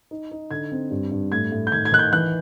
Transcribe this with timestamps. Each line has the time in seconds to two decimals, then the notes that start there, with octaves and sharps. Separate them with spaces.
0.11 D#4
0.31 D#4
0.51 D3 G#6
0.72 C4
0.91 G2
1.11 G2
1.31 A2 G#6
1.52 A2
1.67 G6
1.72 D#3 G#6
1.85 G#6
1.92 D#3 F#6
1.99 G6
2.12 E3 F#6